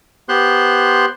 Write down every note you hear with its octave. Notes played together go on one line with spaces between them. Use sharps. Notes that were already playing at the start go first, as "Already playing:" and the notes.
B3 G4 C5 C6 F#6